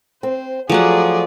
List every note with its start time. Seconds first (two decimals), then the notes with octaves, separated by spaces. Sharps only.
0.23 C4 C5
0.70 F3 F#3 A3 G#4 D5 F#5